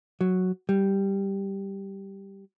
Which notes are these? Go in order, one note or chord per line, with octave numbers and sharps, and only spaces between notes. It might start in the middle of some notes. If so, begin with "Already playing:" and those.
F#3
G3